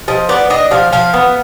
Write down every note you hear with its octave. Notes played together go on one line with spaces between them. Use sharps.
F3 D#5
B3 D5
D4 D#5
F3 F5
F3 F5
B3